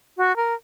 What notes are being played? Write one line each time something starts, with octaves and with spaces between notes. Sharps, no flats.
F#4
A#4